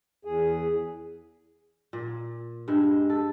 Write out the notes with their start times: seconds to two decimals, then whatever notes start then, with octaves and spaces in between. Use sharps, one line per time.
0.25 E2 G#4
1.93 A#2
2.68 G2 G#3 E5
3.10 A4